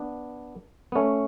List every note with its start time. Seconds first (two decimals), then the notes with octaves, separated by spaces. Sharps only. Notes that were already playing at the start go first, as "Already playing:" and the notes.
Already playing: B3 D4
0.92 B3
0.95 A3 C#4